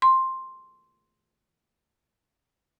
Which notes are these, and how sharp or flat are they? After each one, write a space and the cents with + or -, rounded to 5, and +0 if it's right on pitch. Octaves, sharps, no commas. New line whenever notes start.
C6 +5